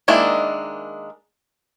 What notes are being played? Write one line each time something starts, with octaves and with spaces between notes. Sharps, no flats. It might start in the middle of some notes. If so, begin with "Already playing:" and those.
D#3 G#3 A#3 D4 E4